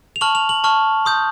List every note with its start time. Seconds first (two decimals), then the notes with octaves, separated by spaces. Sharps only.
0.16 F7
0.21 A5 C#6 F6 F#7
0.35 F7
0.49 F#7
0.64 A5 C#6 F6
1.06 C6 D#6 G6